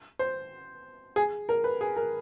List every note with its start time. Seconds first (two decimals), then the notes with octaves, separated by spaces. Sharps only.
0.19 C5
1.16 G#4
1.49 A#4
1.64 B4
1.81 G#4
1.96 A#4